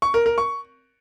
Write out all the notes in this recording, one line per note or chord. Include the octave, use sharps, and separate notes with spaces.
C#6
A#4
A#4
C#6